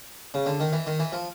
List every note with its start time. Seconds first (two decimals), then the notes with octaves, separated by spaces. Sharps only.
0.34 C#3
0.46 D3
0.60 D#3
0.72 E3
0.87 D#3
1.00 E3
1.12 F3